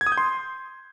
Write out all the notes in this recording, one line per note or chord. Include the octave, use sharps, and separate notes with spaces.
G#6
D#6
G6
C6